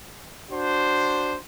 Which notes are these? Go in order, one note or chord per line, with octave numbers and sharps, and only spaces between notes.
D4 F#4 C5